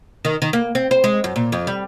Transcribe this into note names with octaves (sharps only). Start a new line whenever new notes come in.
D#3
D#3
A#3
C4
C5
G#3
F#2
A#2
F2
G3